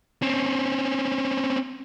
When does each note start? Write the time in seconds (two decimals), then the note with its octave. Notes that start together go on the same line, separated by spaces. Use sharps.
0.22 C4 C#4